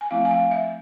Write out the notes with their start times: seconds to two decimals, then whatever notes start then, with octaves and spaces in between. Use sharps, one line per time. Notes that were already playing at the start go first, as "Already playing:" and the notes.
0.01 G#5
0.11 F3 A3 C4 E4 F5
0.25 G#5
0.31 F5
0.51 E5